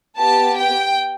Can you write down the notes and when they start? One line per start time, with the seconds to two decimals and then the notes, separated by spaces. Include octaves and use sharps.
0.17 B3 G4 A5
0.55 G5